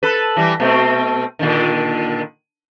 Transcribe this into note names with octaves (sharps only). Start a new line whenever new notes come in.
A4 B4
E3 G3
B2 A3 C4
A#2 D3 D#3